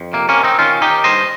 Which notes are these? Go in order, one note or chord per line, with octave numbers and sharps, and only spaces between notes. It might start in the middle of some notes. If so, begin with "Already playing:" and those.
Already playing: F2
C3 A#3
A#3 C#4
D#3
C4 D#4
D#3 C#4 F4
D#3 D#4 G4
G2 C5 D#5